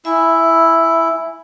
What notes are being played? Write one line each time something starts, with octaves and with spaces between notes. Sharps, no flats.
E4 E5 G#5 B5